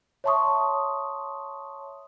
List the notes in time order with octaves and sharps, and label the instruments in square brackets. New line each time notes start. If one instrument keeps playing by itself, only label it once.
[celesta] C#5 E5 A5 C6 C#6 D#6